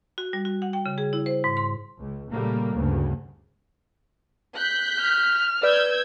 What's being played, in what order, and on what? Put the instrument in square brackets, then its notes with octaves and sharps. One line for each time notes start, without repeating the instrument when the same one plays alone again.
[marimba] F#4
G3
F#4
F#5
G5
C#3
G#4
E4
C5
G#2
C6
[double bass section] C#2
A#2 C#3 G3 A3 A#3
D2 G2 C#3
[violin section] F#6 G6 B6
[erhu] F6
[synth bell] B4 D5 [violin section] E6 G6 G#6